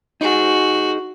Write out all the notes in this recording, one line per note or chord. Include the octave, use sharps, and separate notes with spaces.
D#4 F#4 G#4